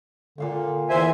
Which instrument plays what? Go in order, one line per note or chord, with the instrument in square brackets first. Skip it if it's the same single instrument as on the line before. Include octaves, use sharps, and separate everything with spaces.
[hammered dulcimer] A#2 F5 G5 [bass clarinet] D3
[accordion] E2 E5 G#5 [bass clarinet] C5